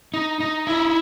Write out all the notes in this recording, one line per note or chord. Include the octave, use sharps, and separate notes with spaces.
D#4
D#4
E4